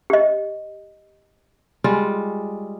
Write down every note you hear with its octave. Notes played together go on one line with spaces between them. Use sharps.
G4 D#5
G3 G#3 F4